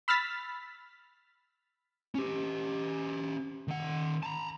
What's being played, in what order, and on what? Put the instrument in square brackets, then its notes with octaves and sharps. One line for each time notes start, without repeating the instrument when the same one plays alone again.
[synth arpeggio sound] B5 E6 F6 A6 B6
[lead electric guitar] C#4 G4
D#3 F#5
A5 A#5